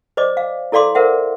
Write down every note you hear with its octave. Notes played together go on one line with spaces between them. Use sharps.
C5 D5 D#5 D6
F5
E4 A4 D5 F5 C6 D6
A#4 C5 E5 F#5